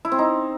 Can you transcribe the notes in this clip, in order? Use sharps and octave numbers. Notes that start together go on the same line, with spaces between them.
E4
C4
D#4